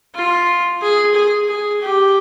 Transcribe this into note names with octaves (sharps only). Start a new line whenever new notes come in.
F4
G#4
G#4
G#4
G4